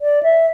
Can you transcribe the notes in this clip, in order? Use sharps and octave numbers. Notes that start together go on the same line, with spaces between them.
D5
E5